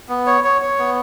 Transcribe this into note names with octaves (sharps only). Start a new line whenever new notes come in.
B3
C#5
C#5
C#5
B3